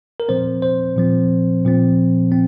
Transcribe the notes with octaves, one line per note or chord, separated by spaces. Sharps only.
A#4
A#2 F3 C4 C5
C5
A#2 F3 C4
A#2 F3 C4
C4